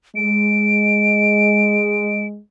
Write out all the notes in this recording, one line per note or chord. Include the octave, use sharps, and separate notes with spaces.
G#3 D7